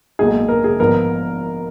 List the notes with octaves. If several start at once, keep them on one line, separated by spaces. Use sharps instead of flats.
B1 A#2 G#3 D#4 G#4
A#4
G#4
G#1 G#2 F3 B3 A#4